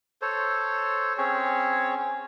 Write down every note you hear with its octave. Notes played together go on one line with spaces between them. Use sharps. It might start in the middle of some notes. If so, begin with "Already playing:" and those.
A4 C5 C#5
C4 C#4 G#4 C#5